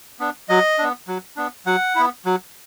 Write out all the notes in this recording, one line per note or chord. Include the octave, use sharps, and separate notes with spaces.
B3 D4
F#3 D#5
B3 D4
F#3
B3 D4
F#3 F#5
B3 E4
F#3